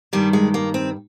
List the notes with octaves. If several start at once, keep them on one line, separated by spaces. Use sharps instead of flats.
G2 D#3 G3
G#3
A#3
C4